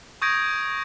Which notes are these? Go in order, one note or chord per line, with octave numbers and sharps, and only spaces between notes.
C#6 D#6 G6 G#6 A#6 D7